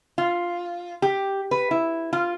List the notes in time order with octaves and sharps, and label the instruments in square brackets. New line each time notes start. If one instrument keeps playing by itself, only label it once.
[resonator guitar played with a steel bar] F4
G4
B4
E4
F4